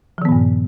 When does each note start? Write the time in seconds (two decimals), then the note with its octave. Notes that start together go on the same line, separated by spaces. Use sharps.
0.18 F3
0.22 D#3
0.25 B3
0.29 A#2
0.32 G2